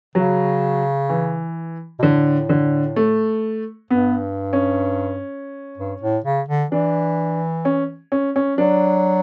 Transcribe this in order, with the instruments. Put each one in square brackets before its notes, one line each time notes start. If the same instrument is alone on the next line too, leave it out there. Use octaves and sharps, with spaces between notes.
[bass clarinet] C#3 [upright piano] F#3
[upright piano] E3
[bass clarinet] B2
[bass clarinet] A2 [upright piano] D3
[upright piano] D3
A3
[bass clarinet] G2 [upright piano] B3
[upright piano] C#4
[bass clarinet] G2
A2
C#3
D3
[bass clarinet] E3 [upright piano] D4
[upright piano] C#4
C#4
C#4
[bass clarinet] F#3 [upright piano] D4